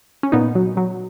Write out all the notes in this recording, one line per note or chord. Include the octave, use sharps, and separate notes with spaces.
C#4
A#2 B3 D#4
F#3
F#3